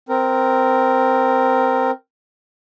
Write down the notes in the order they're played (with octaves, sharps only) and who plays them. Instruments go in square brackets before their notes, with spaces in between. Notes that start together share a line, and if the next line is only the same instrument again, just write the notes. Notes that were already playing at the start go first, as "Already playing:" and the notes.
[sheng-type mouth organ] C4 A#4